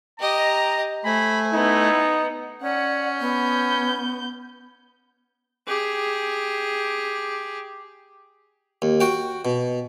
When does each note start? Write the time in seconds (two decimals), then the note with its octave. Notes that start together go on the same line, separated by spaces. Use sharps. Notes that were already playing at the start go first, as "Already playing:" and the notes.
0.20 G4 D#5 A#5
1.05 A3 C5 G#5 B5
1.53 B3 D#4 E4
2.63 C#4 D5 F#5
3.20 B3 G6
5.67 G4 G#4
8.82 D#2
9.00 F#4 G5
9.45 B2